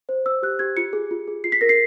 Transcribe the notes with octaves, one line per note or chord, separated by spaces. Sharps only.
C5
C5 E6
G4 F#6
G4 G#6
F4 C#7
G#4
F4
G#4
F4 C7
B6
A#4 A#6
C7